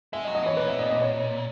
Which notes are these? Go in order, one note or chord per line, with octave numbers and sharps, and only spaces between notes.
G#3 E5
D#5
F#3
D#5
E3 C#5
A#2 B4
E5
D#5
D#5
C#5